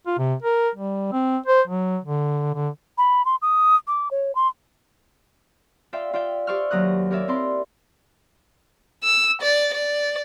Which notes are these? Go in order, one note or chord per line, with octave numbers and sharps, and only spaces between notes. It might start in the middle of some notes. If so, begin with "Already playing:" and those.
F4
C3
A#4
G3
C4
C5
F#3
D3
D3
B5
C6
D#6
D6
C#5
C6
F4 D5 E5 F5 G5
F4 D5 E5 G5
G4 C5 D5 C#6 E6 F6
D#2 F#3 A#5 D#6 F#6
G4 A#4 C#5 D5 E5
C4 E4 D5 A#5 C6
E6
D5
D5